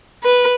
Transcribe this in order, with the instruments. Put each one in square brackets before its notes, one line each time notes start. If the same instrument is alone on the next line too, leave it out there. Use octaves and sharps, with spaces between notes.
[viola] B4